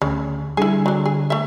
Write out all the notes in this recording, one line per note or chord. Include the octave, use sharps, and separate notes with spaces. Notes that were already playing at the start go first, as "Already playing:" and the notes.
D2 C#3
D3 G3 E4 G#4
F#3 D4
G#4
A3 E5